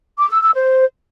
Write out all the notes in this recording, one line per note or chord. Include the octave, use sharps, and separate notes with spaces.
D6
E6
E6
C5